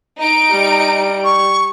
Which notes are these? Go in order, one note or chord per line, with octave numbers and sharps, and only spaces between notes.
D#4 D7
G3
C#6